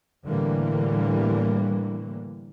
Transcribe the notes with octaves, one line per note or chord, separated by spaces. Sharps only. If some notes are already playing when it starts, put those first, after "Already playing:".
A2 D3 E3 G3 A#3